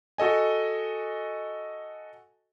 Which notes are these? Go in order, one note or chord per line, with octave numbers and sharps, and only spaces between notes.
F#4 A4 D#5 G#5